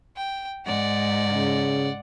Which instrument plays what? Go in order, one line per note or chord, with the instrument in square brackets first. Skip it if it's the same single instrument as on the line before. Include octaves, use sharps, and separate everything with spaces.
[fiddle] G5
[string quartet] G#2 [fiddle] D5 F#5
[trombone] C#3